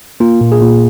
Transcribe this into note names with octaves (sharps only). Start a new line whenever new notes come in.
A#3 F4
A#2
G#4
A#2